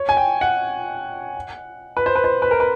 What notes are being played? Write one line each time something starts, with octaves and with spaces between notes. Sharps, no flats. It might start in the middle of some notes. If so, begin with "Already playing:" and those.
Already playing: C#5
G#5
G5
F#5
B4
C5
B4
C5
B4
A#4
B4